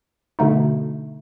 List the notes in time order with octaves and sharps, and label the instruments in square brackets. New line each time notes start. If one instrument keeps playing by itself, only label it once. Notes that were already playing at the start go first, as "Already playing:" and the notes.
[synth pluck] B2 D3 A3 D#4